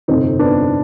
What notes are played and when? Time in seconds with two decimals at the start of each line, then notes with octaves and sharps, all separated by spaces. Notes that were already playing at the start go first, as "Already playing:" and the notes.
0.08 G1 F2 C3 C4 D#4
0.39 B3 D4